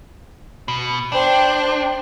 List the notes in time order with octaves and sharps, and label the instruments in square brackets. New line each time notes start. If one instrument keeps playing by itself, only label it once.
[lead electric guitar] B2
[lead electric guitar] D4 [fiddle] C5 G5